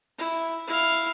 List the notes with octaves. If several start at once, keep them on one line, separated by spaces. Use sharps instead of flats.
E4
E4 F5